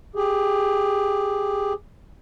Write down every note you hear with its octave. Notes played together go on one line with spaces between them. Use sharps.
G4 G#4